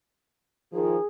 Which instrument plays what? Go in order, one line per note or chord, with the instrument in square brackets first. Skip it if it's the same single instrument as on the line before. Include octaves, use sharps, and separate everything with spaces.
[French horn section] D#3 F3 [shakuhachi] G#4